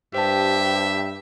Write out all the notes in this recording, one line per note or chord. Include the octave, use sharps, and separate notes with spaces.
G2 G4 C5 E5 A5